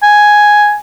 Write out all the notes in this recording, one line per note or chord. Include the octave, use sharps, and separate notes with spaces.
G#5